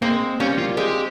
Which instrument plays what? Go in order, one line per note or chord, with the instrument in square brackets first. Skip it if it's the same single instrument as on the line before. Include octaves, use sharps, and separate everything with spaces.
[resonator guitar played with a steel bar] G#3 C4 [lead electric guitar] A#3
[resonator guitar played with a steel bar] G3 A#3 [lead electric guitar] C#4
[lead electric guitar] F4
[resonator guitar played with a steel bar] G#3 C4 [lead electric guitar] G4